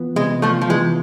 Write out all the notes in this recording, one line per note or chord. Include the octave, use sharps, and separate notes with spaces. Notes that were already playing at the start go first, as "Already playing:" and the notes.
Already playing: E3 B3 F4
C3 G#3
F3 A3 F4
F3
E3 G#3